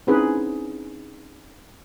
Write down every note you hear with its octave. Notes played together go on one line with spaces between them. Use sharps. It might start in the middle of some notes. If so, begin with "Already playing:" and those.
C4 C#4 D#4 E4 G#4 B4